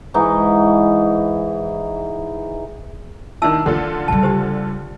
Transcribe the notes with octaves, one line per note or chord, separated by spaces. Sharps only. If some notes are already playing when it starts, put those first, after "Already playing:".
G#2 E3 D#4
D#3 D4 E4 A5 E6
D3 D#3 D4 F4 A4
C#3 G3 A5
D4 G4 C5